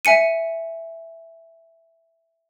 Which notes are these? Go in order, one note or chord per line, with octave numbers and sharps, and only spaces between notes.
E5 G#5 C#7 D#7